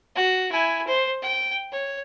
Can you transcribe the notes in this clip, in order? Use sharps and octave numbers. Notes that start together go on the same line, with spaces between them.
F#4
E4 G#5
C5
G5
C#5